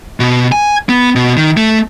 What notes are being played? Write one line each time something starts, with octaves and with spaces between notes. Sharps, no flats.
B2
G#5
B3
B2
D#3
A3